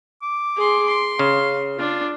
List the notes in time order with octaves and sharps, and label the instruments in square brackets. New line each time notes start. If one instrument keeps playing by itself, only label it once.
[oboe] D6
[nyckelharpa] G#4 C6
C6
[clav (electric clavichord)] C#3 [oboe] F5
[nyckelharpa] D4 [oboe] F4